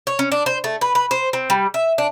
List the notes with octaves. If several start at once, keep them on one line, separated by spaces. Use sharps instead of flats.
C#5
C#4
D4
C5
A3
B4
B4
C5
C4
G3
E5
D4